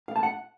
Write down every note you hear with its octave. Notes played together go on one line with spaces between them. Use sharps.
F5
A5
F#5